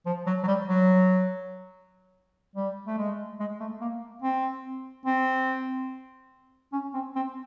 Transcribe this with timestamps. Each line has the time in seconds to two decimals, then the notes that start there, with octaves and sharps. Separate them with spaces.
0.06 F3
0.26 F#3
0.43 F#3
0.47 G3
0.68 F#3
2.56 G3
2.87 A3
2.98 G#3
3.40 G#3
3.60 A3
3.81 A#3
4.22 C4
5.06 C4
6.73 C#4
6.94 C4
7.15 C4